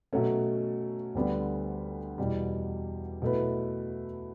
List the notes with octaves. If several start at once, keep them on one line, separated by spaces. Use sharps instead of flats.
B2 F#3 A3 C#4
D2 D3 G3 B3 D4
E2 B2 G3
B2 F#3 A3 E4 B4